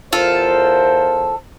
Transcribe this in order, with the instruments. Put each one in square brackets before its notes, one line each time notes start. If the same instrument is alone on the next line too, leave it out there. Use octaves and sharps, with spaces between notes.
[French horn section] E2 A#4 C5 [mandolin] F4 A4